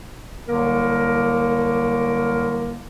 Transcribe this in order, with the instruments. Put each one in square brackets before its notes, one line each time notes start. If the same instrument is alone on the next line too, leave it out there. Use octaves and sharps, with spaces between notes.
[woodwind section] C2 D3 F#3 A#3 A#4